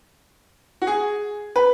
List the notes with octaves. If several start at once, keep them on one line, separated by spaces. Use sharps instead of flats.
F#4
G#4
B4